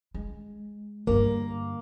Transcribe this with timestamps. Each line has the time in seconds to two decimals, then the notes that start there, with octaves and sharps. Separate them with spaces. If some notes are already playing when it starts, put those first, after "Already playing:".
0.14 G#3
1.07 G2 D3 A#3